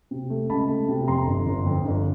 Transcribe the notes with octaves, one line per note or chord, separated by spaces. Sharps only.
C3
A3
C#2 A5 B5
A3
C3
F2 A#5 C6
G1
G1
F2
G1